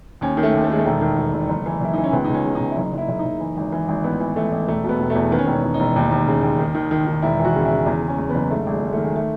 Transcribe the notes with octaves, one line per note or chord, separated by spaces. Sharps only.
D#2 C#4
D#3
A3
D#2
A3
D#3 G#3
A3
E1
D#3
E1
E1
F#1
E3
F#1 E4
E3 D#4
C#4
C#2 B3
C#2 D#4
C#4
C#3
D#4
C#2
E4
F#1 D#4
F#1 E4
F#1
D#4
F#1
E3
G#1
E3
G#1
A1 B3
E3
A1 A3
A1
E1 A3
B2
B3
E1
A3
E2
D#3 B3
C#4
E1 B3
C#4
E1
D#4
E1
D#2
D#2
C#3
D#2
D#3
D#3
D#3
D#3
E1 E4
E3 F#4
C#3
E4
C#3
E2
C#3
C#4
E2
B3
F#1
G#2 A3
G#1 G#3
G#2
A3
D#3
G#3
A3